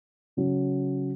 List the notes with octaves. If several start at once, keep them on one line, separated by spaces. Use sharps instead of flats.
C#3 F#3 C#4